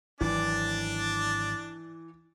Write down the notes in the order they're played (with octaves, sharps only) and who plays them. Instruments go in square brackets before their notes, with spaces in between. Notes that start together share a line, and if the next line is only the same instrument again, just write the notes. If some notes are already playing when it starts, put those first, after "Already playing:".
[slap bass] G#1 F#3 [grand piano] E3 [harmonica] D4 D5